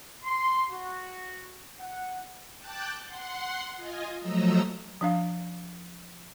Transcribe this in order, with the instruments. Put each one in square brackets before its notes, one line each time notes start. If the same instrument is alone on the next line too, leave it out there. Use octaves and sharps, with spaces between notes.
[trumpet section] C6
F#4
F#5
[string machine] G5 A5 D6 F#6 G6 A6
F#5 C6
F4 D#5 G#5
F3 F#3 A3 D#5 A#5 E6
[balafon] F3 D4 F5